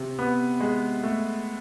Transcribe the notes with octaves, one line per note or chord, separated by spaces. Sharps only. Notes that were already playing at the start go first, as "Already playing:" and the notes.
Already playing: C3
B3
G#3
A3